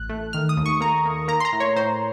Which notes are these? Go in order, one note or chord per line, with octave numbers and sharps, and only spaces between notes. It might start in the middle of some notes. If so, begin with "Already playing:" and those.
Already playing: A1 F#6
A3
D#3 F6
D#6
D#2
C#6
A#3 A#5
A#3
A#3 A#5
C6
A#5
A2
C#5
A2 C5